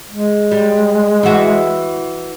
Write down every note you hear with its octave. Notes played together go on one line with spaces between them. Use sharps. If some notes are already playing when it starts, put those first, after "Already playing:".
G#3
G3
E3 F#4